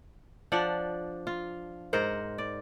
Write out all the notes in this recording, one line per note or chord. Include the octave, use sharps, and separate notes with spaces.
F3 D4 D5 F#5
F4
G#2 A#4 C5 F#5
D5